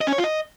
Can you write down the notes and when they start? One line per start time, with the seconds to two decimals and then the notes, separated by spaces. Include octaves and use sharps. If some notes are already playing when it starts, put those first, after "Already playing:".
0.01 D#5
0.07 C#4
0.13 C#5
0.18 F4
0.24 D#5